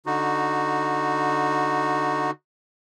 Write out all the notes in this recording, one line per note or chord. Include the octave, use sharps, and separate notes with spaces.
D3 D#4 F#4